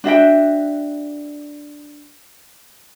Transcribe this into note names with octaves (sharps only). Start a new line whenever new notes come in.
D4 F#4 E5 G5